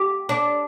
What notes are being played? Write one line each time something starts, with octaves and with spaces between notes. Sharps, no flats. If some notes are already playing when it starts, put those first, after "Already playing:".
Already playing: G4
D4